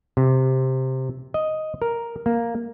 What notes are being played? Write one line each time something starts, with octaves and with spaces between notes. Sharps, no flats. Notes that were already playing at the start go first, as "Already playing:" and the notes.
C3
D#5
A#4
A#3